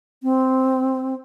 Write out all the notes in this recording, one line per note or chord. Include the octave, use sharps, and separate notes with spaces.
C4